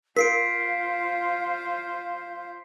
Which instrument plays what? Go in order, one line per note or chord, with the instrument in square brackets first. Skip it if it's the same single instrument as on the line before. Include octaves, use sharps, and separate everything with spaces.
[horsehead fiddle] F4 C5 [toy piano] A#4 [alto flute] F5 [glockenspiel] B6 C7 D7